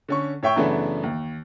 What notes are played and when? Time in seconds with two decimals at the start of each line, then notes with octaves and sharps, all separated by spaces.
0.09 D3 C#4 C#6
0.43 A2 C#5 E5 G5 C#6
0.56 F#2 C#3 E3 A3 B3 D4
1.03 D#2